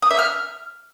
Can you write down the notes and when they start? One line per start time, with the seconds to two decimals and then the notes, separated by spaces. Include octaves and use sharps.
0.02 D#6
0.11 E5
0.19 F6